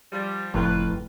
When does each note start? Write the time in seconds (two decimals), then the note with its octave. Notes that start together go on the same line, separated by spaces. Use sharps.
0.12 F3 G3
0.54 F#1 F2 A2 F4 A#4 B4